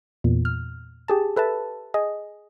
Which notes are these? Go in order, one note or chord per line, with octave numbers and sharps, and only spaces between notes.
E2 A#2
F6
G4 G#4 A5
A4 B4 E5 A5
G#4 D#5